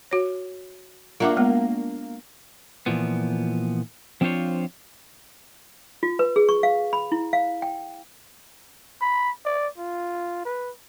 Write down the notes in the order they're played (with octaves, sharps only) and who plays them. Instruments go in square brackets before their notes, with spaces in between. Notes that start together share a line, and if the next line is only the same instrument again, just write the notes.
[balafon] F#4 C#5
[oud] A#3 D4 F#4 [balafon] F4 E5 D6
[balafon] G#3 B3
[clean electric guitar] A#2 E3 F3 B3
F3 C4 D4 F4 C5 C#5
[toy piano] F4
B4
G#4
C#6
F5
B5
E4
F5
G5
[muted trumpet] B5
D5
F4
B4